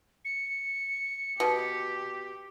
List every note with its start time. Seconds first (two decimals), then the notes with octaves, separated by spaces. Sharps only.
0.25 C#7
1.40 B2 G4